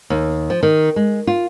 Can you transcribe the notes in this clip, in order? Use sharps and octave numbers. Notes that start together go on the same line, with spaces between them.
D#2
F3
D#3
G#3
F4